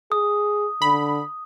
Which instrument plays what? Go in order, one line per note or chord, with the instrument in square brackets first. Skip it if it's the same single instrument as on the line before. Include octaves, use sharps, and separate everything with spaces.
[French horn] G#4 [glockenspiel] D#6
[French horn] D3 [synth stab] B5